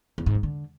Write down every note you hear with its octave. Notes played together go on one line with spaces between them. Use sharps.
E2
G#2
E3
D3